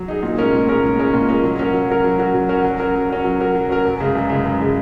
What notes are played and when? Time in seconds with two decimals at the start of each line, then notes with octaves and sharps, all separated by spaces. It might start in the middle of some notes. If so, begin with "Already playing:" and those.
Already playing: F#3
0.08 D#4 G#4
0.23 A#2
0.38 G#3 C#4 A#4
0.53 A#2
0.69 G#3 C#4 A#4
0.83 A#2
0.98 G#3 C#4 A#4
1.14 A#2
1.28 G#3 C#4 A#4
1.44 F#3
1.59 C#4 F#4 A#4
1.74 F#3
1.89 C#4 F#4 A#4
2.04 F#3
2.19 C#4 F#4 A#4
2.34 F#3
2.49 C#4 F#4 A#4
2.64 F#3
2.80 C#4 F#4 A#4
2.94 F#3
3.10 C#4 F#4 A#4
3.25 F#3
3.39 C#4 F#4 A#4
3.55 F#3
3.70 C#4 F#4 A#4
3.85 F#2
4.00 C#3 G#3
4.15 F#2
4.30 C#3 G#3
4.45 F#2
4.61 C#3 G#3